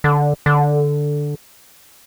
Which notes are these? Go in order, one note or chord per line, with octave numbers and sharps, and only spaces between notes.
D3
D3